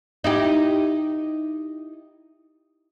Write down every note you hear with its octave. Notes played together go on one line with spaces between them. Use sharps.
D#4 E4 G4